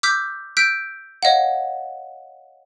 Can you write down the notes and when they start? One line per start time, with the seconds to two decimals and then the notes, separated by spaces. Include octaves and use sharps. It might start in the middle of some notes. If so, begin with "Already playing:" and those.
0.03 D6 E6 F6 G6 B6
0.57 E6 F#6 G6 B6 D7
1.23 C#5 D#5 F5 F#5